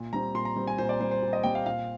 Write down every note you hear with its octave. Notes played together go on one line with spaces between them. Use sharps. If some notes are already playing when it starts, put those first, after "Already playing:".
Already playing: A#2
G3 C4 A#5
A#2 C6
A#5
G3 C4
G#5
A#2 C5
D5
G3 C4 C5
C5
A#2
D#5
G3 C4 G5
F5
A#2 F5